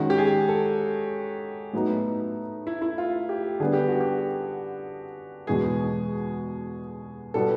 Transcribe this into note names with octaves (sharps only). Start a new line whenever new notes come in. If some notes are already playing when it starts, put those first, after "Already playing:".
Already playing: D#3 G#3 C#4 F#4
G4
G#4
A4
A2 F#3 B3 D#4
E4
E4
F4
G4
D3 G3 B3 D4 G#4
G4
F#4
G4
E2 B2 G#3 B3 G#4
B2 G3 B3 A4